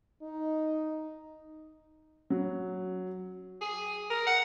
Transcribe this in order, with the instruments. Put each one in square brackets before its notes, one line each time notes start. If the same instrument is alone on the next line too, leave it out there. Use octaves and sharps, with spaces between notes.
[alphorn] D#4
[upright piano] F#3
[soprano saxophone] G#4
A#4
F#5